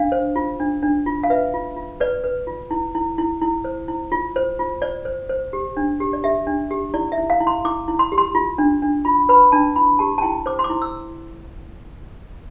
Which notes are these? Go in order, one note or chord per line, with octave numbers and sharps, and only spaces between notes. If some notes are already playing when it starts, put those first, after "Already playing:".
Already playing: D4 F5
C5
F4
D4
D4
F4
F5
B4 E5
F4
F4
B4 D5
B4
F4
E4
E4
E4
E4
C5
E4
F4
C5
F4
C5 D5
C5
C5
G4
D4
G4
D5
G4 E5
D4
G4
E4 D5
E5
E4
F5
E4
C6
E4 D6
E4
C6
G4
C6
F4
D4
D4
F4 B5
B4 B5
D4 A5
E4 B5
G4 A5
A5
E4 G5
C5 D6
C6
D6
E4
E6